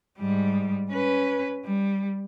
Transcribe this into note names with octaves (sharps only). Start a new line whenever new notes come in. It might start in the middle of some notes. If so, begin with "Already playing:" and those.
G#2 G3
C#4 B4
G3